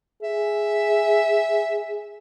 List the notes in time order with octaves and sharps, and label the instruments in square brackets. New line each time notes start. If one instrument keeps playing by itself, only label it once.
[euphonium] G#4 [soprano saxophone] E5